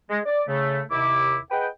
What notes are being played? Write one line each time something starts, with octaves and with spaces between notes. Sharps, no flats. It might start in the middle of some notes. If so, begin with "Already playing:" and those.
G#3
D5
C#3 A3
D#2 C3 E4 D6
G#4 B4 D#5 F#5 G5